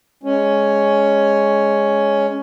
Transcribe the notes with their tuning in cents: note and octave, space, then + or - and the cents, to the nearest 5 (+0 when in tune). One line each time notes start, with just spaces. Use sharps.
G#3 +0 C#4 +5